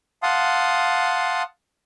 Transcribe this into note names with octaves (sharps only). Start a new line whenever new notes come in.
F5 F#5 A5 C6 D#6